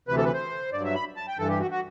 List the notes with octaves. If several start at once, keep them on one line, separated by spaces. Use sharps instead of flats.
D2 C3 E3 B4
A4
B4
C5
G2 F#3 D5
E5
B5
A5
G5
G2 E3 A4
G4
F#4
F#4